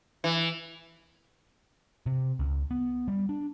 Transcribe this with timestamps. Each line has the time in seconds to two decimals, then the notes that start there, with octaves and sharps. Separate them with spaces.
0.24 E3
2.06 C3
2.39 C#2
2.71 B3
3.08 G3
3.29 D4